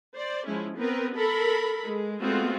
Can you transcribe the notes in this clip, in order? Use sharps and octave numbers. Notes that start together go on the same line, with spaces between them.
C5 D5
F3 G#3 C#4 E4
B3 C4 A#4 B4
A4 A#4 B5
G#3
G#3 A3 B3 C4 F4 F#4